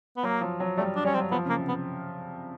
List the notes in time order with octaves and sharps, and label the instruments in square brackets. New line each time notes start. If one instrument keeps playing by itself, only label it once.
[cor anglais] B3
[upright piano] F#3 [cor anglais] A#3
[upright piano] F3
F#3
[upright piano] G3 [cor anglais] A3
[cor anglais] D4
[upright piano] G3 [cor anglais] C#4
[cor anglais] C4
[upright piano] F#3
[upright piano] F3 [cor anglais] B3
[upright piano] C#3 [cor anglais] A#3
[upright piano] C3
[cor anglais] B3